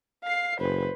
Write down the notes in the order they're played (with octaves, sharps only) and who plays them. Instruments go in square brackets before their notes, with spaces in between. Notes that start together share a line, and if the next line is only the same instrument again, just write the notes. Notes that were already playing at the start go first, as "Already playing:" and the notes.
[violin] F5 C7
[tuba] F#1 [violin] B4 C5